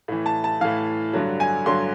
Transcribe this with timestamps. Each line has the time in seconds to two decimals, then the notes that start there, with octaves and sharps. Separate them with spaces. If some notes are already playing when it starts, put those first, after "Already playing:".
0.08 A2 E3
0.26 A5
0.44 A5
0.61 A2 E3 F5
1.13 G2 D3 F#3
1.40 G#5
1.66 G2 D3 F#3 C6